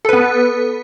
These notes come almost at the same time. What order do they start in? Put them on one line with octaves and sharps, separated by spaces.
A4 B4 B3